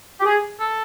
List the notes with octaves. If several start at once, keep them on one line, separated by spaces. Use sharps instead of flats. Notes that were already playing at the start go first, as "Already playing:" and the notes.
G4
G#4
A4